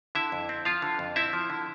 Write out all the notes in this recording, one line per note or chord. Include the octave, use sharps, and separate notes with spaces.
D3 E4 E5
F2
C4
F3 F4 F5
D3
F2
C4 E4 E5
F3
D3